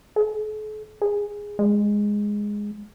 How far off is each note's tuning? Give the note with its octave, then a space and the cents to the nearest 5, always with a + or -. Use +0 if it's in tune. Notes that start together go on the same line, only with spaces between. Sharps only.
A4 -45
G#4 -10
G#3 -5